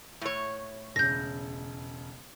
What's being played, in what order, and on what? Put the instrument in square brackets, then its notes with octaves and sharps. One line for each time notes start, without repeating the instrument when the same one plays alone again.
[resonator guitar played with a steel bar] A2 C#5
[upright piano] E1 C#3 [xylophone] G6 A#6